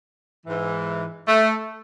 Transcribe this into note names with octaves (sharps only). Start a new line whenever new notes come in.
G#2 E3
A3